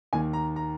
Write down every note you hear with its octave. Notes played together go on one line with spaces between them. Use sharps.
D#2 D#3 G#5
A#5
A#5